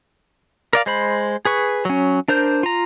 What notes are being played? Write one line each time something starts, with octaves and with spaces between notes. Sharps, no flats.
A#4 D5 F5
G#3 C5 B5
G#4 B4 C#6
F#3 C#4
D4 A#4 C5 G6
F4 A#5